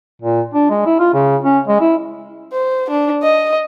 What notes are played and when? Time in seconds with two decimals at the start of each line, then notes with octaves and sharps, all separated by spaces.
0.22 A#2
0.54 D4
0.70 G#3
0.86 E4
0.99 F4
1.14 C#3
1.44 C#4
1.68 G#3
1.81 E4
2.52 C5
2.90 D4
3.23 D#5